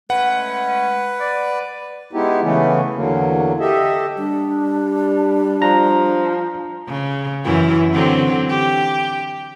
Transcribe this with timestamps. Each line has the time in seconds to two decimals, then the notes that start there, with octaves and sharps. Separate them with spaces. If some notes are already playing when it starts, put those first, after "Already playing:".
0.10 G#3 A3 C#4 B4 F#5
1.20 D5
2.13 G#3 B3 D#4 E4 G4
2.43 C#3 E3 A3 B3 C#4
2.95 E2 D3 F#3 A#3
3.60 G4 A4 D#5 E5
4.17 G3 D4
5.62 F3 A#5
6.88 C#3
7.45 F#2 E3 E4
7.93 D3 F#3 C4
8.49 G4